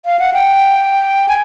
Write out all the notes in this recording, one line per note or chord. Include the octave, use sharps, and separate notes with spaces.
F5
F#5
G5
G#5